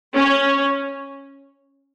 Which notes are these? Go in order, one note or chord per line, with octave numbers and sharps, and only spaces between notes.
C#4